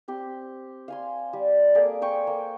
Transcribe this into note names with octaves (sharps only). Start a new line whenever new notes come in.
C4 G4 C6
F5 G#5 C6
G3
A#3 G#4 A4 D5
C5 G5 C#6
A#3